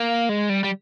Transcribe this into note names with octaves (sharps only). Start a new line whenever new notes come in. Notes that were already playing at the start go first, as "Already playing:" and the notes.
Already playing: A#3
G#3
G3
G3